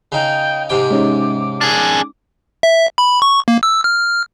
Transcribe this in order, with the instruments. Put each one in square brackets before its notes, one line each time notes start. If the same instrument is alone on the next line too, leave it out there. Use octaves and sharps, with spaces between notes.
[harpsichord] C#3 D#4 [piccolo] G5
[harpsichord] G#2 C3 G5 [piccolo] D6
[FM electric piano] G#3 C#4 D#4
[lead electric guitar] D4 G#4
[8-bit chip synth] E5
B5
C#6
A#3
E6
F6